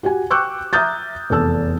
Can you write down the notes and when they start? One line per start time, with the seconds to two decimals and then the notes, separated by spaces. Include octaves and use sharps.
0.03 F#4 G4 F#5 G#5
0.31 G5 C#6 D6 E6 F#6 G6
0.73 E5 A#5 D#6 F6 G6 A6
1.30 F1 E2 A4 A5 E6